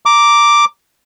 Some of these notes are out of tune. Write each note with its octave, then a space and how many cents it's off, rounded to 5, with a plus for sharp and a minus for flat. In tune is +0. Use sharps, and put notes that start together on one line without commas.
A#5 +0 D6 +0